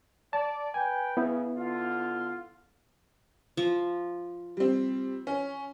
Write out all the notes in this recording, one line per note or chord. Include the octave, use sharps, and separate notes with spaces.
D5 A5
B4 G5 G#5
C#3 B3 E4
D3 F4
F3
G3 C4
C#4